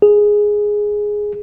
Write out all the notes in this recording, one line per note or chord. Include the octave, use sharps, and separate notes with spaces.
G#4